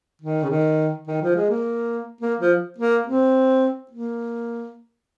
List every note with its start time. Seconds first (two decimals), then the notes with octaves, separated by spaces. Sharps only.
0.21 D#3
0.42 C#3
0.49 D#3
1.07 D#3
1.22 F3
1.35 G#3
1.49 A#3
2.20 A#3
2.40 F3
2.78 A#3
3.06 C4
3.91 A#3